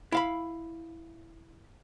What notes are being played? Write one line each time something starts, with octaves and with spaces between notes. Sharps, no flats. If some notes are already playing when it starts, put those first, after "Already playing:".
E4 F5 B5